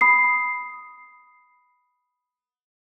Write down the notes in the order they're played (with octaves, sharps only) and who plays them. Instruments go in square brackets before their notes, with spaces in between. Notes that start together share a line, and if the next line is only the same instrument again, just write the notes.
[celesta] B5 D#6 C7